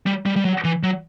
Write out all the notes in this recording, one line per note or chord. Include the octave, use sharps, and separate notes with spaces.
G3
G3
G3
F#3
E3
F#3